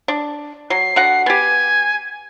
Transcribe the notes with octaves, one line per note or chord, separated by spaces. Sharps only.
D4
F#3 C7
D3 F#4 F#5
B3 G4 G#5